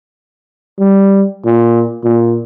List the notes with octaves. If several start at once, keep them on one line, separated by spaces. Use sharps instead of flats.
G3
A#2
A#2